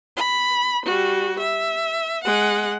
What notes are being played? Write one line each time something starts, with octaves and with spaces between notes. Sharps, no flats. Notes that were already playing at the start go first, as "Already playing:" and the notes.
B5
G3 F#4
E5
G#3 F#5